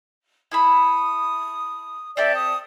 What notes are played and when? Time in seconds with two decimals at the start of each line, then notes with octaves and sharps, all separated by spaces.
0.51 E4 A4 B5 D#6
2.17 C4 G4 A4 D5 E5
2.36 D#6